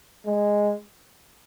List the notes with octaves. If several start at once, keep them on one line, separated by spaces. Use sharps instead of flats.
G#3